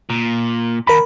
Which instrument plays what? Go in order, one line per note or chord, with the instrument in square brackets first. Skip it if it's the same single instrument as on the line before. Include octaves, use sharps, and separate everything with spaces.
[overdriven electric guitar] A#2
[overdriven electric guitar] D#2 [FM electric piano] A#4 B5